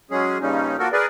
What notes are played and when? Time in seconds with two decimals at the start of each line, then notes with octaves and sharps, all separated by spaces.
0.11 F#3 G#3 C#4 G#4
0.41 G2 A#2 C#3 G3 C#4 D#4
0.79 F3 A#3 F#4 A4 A#4
0.92 G#4 A#4 B4 D5